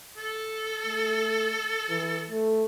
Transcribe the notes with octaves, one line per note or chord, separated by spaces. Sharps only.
A4
A3
E3
A3